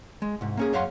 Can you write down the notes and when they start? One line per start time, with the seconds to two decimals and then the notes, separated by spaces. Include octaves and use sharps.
0.22 G#3
0.41 C2 G#2
0.57 A#3 C#4 G#4
0.73 F#2 C#5 F5 F#5 C6